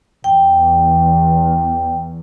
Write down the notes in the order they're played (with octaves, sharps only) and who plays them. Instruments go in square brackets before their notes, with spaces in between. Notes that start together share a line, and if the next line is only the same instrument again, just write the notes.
[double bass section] E2 [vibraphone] G5